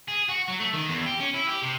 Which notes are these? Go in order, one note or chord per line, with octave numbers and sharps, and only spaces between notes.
G#4
F#4
F#3
A3
D#3
E2
G4
C#4
E4
G4
C3